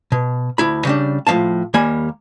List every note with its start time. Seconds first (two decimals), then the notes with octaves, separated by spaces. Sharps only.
0.12 B2
0.58 D2 E4 B5
0.85 C#3 G3 D4
1.27 A2 F3 A#3 F5 A5
1.74 D#2 G3 A#3 G#5 B5